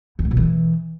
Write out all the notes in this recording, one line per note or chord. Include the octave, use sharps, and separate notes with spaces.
E2
G#2
B2
E3